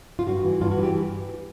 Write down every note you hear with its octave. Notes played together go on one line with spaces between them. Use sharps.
F4
G2 F#4
E3
G2 F4
F#4
E3
G4